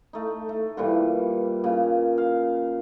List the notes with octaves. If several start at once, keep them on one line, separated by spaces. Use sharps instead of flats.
A3 D#4
A3
G2 A#2 E3 G3
A#2 C#3
F5